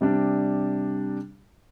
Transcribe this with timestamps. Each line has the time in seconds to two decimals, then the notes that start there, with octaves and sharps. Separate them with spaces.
0.01 C3 G3 D4